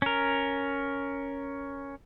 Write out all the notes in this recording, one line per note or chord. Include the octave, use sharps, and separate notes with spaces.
C#4 A#4